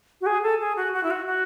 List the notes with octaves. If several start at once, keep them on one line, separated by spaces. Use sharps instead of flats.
F#4
G#4
A4
G#4
F#4
F#4
E4
F#4
F#4